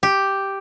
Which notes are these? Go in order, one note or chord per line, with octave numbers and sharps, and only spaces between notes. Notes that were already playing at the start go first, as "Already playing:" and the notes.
G4